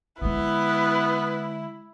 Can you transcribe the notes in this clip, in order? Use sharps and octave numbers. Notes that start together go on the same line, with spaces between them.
D3 G#3 B3 E4 B4